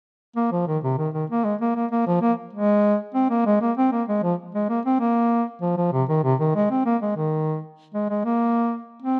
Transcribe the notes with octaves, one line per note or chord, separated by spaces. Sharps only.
A#3
F3
D#3
C3
D#3
D#3
A#3
G#3
A#3
A#3
A#3
F3
A#3
G#3
C4
A#3
G#3
A#3
C4
A#3
G#3
F3
G#3
A#3
C4
A#3
F3
F3
C3
D#3
C3
D#3
G#3
C4
A#3
G#3
D#3
G#3
G#3
A#3
C4